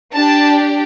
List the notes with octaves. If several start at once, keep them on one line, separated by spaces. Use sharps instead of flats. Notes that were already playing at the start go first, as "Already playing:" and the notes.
D4 G4 A5